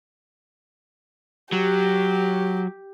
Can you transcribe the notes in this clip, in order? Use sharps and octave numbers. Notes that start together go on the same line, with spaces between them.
F#3 G4